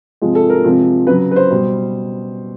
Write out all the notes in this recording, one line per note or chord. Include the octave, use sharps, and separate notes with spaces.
C3 F3 G#3
A4
A#4
C3 F3 G#3
C#3 F#3 B4
B4
C5
B2 G3